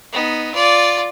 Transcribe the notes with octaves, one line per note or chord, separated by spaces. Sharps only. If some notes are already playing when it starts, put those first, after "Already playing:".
B3 D#4
F4 D5